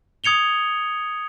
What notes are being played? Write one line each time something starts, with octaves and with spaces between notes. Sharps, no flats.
D#6 G#6 C#7 F7 G7